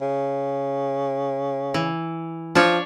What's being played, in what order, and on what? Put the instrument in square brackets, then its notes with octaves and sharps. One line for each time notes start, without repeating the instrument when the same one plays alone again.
[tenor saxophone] C#3
[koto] E3
[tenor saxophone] F3 [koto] D4 C#5